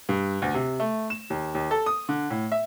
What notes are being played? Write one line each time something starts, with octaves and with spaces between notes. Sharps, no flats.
G2
D2
C3
A3
E7
D#2
D#2
A4
D#6
D3
A2
E5